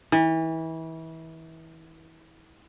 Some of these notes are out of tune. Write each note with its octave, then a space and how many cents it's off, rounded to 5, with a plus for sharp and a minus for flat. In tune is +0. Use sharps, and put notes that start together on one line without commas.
E3 -30